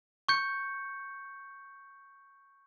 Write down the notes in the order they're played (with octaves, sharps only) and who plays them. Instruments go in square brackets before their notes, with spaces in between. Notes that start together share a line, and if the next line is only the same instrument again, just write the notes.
[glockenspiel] C#6 G6 C#7